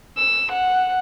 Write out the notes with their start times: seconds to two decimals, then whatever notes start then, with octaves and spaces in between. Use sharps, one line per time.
0.18 E6
0.52 F#5